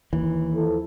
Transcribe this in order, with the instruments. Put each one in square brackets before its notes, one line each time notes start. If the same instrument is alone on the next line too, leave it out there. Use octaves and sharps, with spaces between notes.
[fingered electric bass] D#2 E3
[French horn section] F3 E4 A4